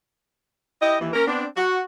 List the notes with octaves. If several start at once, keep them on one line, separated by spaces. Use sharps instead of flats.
E4 G4 D#5
D#2 E3
A#3 C#4 A#4
B3 C4 D4
F#4